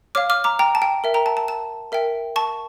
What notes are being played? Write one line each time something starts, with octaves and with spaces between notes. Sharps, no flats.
C#5 F5 D6 F6
D6 F6
A#5 D6
G5 A#5
A5
G5
A#4 E5 G5
G5 A#5
A5
A5
A5
A#4 E5 G5
A5 C#6